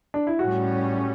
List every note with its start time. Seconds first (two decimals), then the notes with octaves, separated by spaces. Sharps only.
0.14 D4
0.27 E4
0.39 A2 G3 C#4 F#4